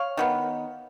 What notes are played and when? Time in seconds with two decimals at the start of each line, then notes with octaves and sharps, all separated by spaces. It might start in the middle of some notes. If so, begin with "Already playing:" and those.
Already playing: C#5 F5
0.17 D#3 F#3 B3